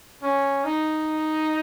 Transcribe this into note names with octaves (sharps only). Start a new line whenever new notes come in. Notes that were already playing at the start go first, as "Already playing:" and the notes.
C#4
D#4